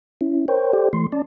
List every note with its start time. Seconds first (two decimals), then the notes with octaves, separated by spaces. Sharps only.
0.21 C#4 E4
0.48 A#4 C5 C#5 G5
0.73 G4 A4 C5 D5 G5
0.93 E3 A3 C6
1.12 C#4 D5 A5